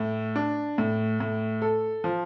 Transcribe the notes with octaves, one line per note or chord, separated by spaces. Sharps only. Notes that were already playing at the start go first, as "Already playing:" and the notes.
Already playing: A2
D4
A2
A2
A4
F3